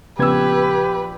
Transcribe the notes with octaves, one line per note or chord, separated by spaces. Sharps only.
A#1 C#3 B3 G4 B4 E6 G#6